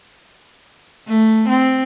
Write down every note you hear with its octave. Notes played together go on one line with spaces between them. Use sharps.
A3
C4